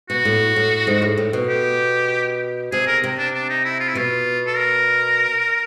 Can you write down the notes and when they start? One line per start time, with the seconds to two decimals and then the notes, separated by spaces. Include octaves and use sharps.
0.10 B2 F#4
0.25 A2
0.56 A2
0.87 G#2
1.02 A2
1.18 A2
1.33 B2
1.49 G4
2.72 C3 G#4
2.87 A#4
3.04 C3
3.18 D4
3.34 D4
3.49 D#4
3.65 E4
3.80 F4
3.89 E4
3.95 B2 F4
4.47 A4
4.57 A#4